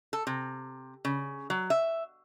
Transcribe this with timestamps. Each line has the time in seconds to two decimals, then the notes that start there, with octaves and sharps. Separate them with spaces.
0.13 A4
0.27 C3
1.05 C#3
1.50 F#3
1.70 E5